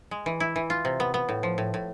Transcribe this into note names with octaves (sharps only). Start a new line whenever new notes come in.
G#3
E3
E4
E3
F4
C3
B3
B3
A2
F3
A2
A2